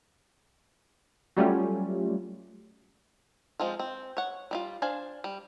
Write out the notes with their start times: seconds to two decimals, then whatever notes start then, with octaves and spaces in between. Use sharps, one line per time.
1.37 F#3 G3 A3 C#4 F4
3.60 F3 G#3 C4 F4
3.79 C4
4.17 C#5 F#5
4.51 G3 D#4 F4
4.82 D4 C5 F5 G#5
5.24 G3